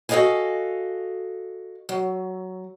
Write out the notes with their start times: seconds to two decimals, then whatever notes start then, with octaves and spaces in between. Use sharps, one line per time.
0.09 F#4 A4 B4 D#5 F5 G#5
1.89 F#3